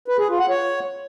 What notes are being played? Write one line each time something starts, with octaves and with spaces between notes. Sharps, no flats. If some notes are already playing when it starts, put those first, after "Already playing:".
B4
G#4
F4
F#5
C#5